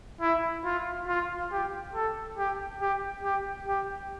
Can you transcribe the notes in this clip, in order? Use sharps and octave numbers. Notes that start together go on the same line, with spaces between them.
E4
F4
F4
G4
A4
G4
G4
G4
G4